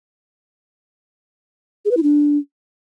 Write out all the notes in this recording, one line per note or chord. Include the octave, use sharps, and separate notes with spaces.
G#4
B4
E4
D4